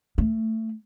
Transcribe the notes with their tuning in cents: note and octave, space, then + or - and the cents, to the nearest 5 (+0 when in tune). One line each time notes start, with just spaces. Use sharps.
A3 +20